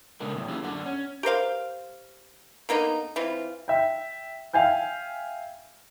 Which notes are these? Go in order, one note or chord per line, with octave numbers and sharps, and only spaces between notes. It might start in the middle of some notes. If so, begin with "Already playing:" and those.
C#3 G#3 A3 B3 D4 A#4
A2 D#3 E3 G3
A#3 C#4 E4 F4 G4 G#4
F#2 D3 D4 F#5
C#4
G4 A#4 C5 F5
D3 A#3 B3 D#4
E3 C4 F4
E5 G5
E5 F5 G5 G#5 G6